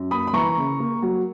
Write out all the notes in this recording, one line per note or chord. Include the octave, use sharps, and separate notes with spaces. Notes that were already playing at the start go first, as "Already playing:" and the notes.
Already playing: F#2
A#3 B5 D#6
B5
E3 A#5 C#6
C#3
A#3
F#3